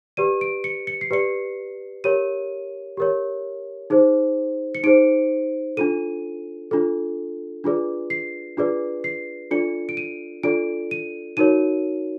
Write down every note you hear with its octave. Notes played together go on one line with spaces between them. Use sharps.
G4 B4 D5 D#7
D7
C#7
C#7
C7
G4 B4 D5 C#7
G4 A#4 C#5 D#7
G4 A#4 C#5
D#4 G#4 C5
C#7
D#4 G#4 C5 D7
D4 F4 A4 D#7
D4 F4 A4
D4 F4 G#4 B4 D5
C7
D4 F4 G#4 B4 D5
C7
D4 F4 A4 D5 C#7
D7
D#7
D4 F4 A4 D5 D7
D#7
D#4 F#4 A#4 C#5 D#7